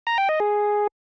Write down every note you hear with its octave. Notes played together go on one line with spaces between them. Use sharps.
A#5
G5
D#5
G#4